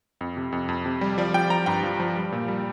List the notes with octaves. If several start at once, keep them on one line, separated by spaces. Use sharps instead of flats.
F2
C3
F2
F2
C3
G3
F3 D5
F3 G5
F3 A#5
G2 G5
F3
F3
G3
A#2
G3